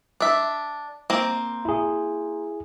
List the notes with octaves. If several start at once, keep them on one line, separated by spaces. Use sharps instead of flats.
D4 E5
A#3 C4
E4 G#4